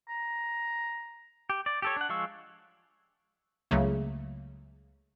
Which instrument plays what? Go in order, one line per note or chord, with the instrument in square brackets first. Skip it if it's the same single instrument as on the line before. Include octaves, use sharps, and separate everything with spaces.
[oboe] A#5
[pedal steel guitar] G4
D5
G4 A4 C#5
D4 F#5
F3 G#3 F5 C#6 E6
[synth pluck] C#2 C#3 F#3 A3 A#3